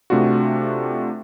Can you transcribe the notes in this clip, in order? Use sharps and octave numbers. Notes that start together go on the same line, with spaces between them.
C3 A3 D4 F4 F#4